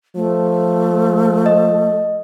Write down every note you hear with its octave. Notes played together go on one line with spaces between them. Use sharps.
F3 A3
D#5